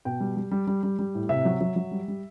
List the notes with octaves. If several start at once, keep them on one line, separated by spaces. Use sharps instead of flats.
B2 G5
G3
G3
G3
G3
G3
G3
A2
C3 E5
F#3
F#3
F#3
G3
G3